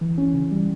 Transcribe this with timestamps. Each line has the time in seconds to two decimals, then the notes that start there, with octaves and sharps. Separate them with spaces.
0.01 E3
0.18 C#4
0.34 C#3
0.51 G3